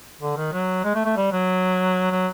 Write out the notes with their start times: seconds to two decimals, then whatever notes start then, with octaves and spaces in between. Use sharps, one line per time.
0.21 D3
0.37 D#3
0.53 F#3
0.84 G#3
0.95 A3
1.05 A3
1.17 G3
1.32 F#3
2.11 F#3